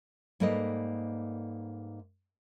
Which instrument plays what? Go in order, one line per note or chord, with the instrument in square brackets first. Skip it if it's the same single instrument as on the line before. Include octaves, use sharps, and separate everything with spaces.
[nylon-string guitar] G#2 G3 A#3 A4 B4 D#5